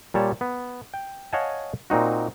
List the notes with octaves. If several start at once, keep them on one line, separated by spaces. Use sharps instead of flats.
A#2 G3 C#5 A5
B3
G5
C#5 D#5 F5 F#5 G#5 A5
A#2 C4 D#4 F#4